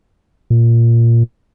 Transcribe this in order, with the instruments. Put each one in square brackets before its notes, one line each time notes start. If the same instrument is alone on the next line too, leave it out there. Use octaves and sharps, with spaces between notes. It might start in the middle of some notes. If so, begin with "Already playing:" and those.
[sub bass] A#2